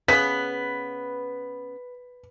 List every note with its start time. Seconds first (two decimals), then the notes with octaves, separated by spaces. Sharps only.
0.08 C#3 B3 B4 B6